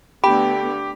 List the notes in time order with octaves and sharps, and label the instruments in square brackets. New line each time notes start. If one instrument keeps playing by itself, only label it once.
[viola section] D3 A3 B3 [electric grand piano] G4 [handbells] G5 [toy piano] B5